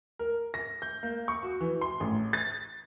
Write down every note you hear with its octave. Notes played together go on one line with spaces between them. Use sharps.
A#4
A#6
G6
A#3
C#6
F#4
E3
C6
A1
A6